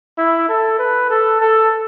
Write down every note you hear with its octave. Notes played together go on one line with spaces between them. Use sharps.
E4
A4
B4
A4
A4